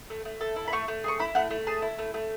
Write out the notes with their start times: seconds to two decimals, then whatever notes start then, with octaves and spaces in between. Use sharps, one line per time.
0.10 A3
0.25 A3
0.41 A4
0.56 E4
0.68 B5
0.73 A3 C#6
0.88 A3
1.04 G#4 C#6
1.20 E4 B5
1.35 A3 F#5
1.51 A3
1.67 G#4 A5
1.82 E4
1.99 A3
2.14 A3